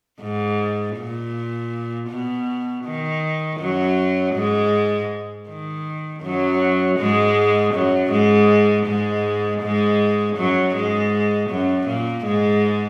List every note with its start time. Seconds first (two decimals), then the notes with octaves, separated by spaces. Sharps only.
0.21 G#2
0.97 A#2
2.10 B2
2.85 D#3
3.59 F#2 F#3
4.35 G#2 G#3
5.48 D#3
6.23 F#2 F#3
6.99 G#2 G#3
7.73 F#2 F#3
8.11 G#2 G#3
8.86 G#2 G#3
9.61 G#2 G#3
10.36 F#2 F#3
10.75 G#2 G#3
11.49 F#2 F#3
11.87 A#2 A#3
12.25 G#2 G#3